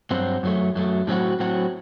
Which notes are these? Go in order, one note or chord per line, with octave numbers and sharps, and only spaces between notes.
G2 F#3 C4 F#4 C5
F#2 F#3 A3
F#2 F#3 A3
A2 F#3 C4 F#4
A2 F#3 C4 F#4